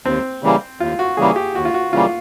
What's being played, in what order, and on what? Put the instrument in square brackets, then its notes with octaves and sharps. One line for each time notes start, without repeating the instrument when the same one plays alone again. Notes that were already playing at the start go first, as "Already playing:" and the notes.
[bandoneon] D#2 [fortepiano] C4
[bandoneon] C#3 E3 G3 A#3
[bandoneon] D#2 [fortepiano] F4
[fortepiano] F#4
[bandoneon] C#3 E3 G3 A#3 [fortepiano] G#4
[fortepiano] G4
[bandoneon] D#2 [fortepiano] F#4
[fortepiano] F4
F#4
[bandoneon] C#3 E3 G3 A#3 [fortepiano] F4